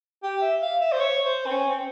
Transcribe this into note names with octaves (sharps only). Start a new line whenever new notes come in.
G4
E5
F5
E5
C5
C#5
C5
C4
C#4
C4